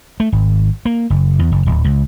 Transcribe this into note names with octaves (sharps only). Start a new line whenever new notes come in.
A3
G#1
A#3
F#1
E2
F#1
D1
C#2